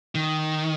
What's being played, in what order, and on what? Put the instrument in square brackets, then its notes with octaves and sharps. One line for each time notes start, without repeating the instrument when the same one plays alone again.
[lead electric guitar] D#3